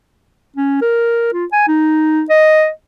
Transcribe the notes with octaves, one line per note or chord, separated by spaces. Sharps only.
C#4
A#4
F4
G#5
D#4
D#5